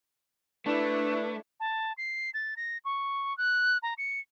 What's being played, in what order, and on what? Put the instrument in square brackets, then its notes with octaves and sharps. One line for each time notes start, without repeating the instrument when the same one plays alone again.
[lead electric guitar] A3 [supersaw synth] D4 E4 [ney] B4
[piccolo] A5
C7
A6
A#6
C#6
F#6
A#5
C#7